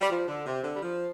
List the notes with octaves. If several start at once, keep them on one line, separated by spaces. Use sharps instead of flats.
G3
F3
D3
C3
D3
G3
F3